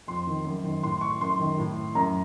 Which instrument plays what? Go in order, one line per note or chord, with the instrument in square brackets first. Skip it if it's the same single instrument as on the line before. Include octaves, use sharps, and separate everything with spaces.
[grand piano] F2 C6
D#3
F#2
D#3
A2 C6
C#6
F#2 C6
D#3
A2
F#2 A#5